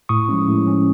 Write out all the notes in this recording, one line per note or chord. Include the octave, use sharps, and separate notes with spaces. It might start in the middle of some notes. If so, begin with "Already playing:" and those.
A2 C#6 D#6
F3 G#3 C#4
A2
F3 G#3 C#4